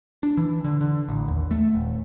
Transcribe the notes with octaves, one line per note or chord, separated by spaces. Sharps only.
D4
E3
D3
D3
A1
D#2
A3
D#1